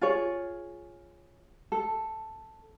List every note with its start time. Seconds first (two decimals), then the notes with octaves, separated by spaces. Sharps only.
0.01 F4 G#4 C#5
1.72 A4